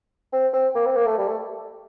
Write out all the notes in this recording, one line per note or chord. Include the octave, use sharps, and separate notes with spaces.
C4
C4
A#3
C4
A#3
A3
G3
A3